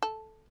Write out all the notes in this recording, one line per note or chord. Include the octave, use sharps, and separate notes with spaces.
A4